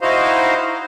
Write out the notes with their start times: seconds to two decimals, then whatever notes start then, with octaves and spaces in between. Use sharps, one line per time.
0.01 D#4 E4 F#4 C5 D#5 F5